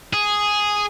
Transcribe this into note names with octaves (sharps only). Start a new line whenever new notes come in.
G#4